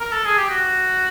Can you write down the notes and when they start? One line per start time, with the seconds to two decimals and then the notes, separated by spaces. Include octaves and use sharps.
0.00 A#4
0.12 A4
0.25 G#4
0.37 G4
0.49 F#4